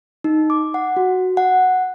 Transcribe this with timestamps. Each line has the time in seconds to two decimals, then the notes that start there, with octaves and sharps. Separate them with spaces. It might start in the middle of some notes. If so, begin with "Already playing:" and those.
0.24 D#4
0.50 D6
0.74 F#5
0.97 F#4
1.37 F#5